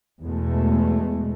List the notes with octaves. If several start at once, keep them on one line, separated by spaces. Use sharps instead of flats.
E2 B2 G#3 A3